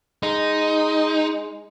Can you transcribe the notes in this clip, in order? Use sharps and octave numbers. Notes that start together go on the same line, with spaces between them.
G#3 D#4